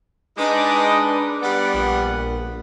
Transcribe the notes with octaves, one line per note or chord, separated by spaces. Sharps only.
G#3 D4 D#4 B4 D6
G3 B3 D5 F#5
A#1